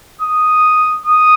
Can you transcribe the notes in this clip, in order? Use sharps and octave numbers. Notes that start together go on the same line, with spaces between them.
D#6
D#6